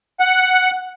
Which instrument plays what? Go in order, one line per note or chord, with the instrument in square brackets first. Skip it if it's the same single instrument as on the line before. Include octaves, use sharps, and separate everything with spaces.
[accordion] F#5